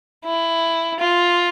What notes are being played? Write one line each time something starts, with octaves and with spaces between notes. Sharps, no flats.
E4
F4